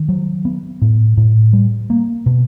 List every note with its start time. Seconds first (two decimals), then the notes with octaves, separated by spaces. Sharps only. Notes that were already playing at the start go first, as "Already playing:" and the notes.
Already playing: D#3
0.09 F#3
0.45 B3
0.82 A2
1.17 A2
1.53 G3
1.90 A#3
2.26 B2